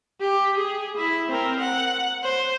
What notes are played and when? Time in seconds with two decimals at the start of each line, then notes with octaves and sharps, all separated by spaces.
0.21 G4
0.58 G#4
0.97 E4 E5
1.28 C4 A#4
1.60 F#5
2.23 C5